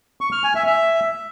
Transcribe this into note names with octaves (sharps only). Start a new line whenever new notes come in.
C#6
F6
G#5
E5
E5